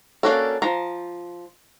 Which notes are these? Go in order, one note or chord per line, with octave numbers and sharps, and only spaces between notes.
A#3 C#4 D4 F#4 A4
F3 A#5